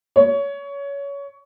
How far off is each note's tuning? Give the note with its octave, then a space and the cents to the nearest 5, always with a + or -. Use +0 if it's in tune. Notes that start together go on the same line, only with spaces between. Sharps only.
C#5 +20